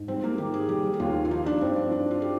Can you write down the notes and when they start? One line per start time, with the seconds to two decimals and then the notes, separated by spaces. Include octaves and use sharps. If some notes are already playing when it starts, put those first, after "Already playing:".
Already playing: G#2
0.08 G3 C4
0.24 A#3
0.38 D#3 G4
0.54 G#4
0.69 G3 G4
0.94 G4
1.00 D#2 F4
1.25 F4
1.30 F3 D#4
1.46 D4
1.61 G2 C4
1.91 G2 D4
2.11 F4
2.22 G4